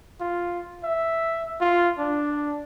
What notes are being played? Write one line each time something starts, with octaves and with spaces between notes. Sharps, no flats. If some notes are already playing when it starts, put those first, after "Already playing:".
F4
E5
F4
D4